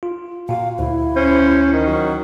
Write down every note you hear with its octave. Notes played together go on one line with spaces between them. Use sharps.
F4
A#2 F#4 F5
D2 E4
C#4 C5
D#3
F#3 F#4